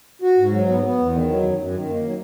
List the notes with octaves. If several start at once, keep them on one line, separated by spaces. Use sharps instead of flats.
F#4
G#2
F#3
B3
B3
E2
D#3
F#3
F#2
F#2
D#3
A#3
F#3